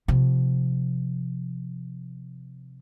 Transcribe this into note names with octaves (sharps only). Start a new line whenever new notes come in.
C3 F3